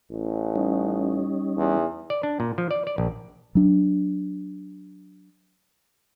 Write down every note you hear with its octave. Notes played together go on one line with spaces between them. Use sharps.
A1
G3 C#4 D#4
E2
D5
D4
A#2
F3
D5
D5
A#1
F#3 D4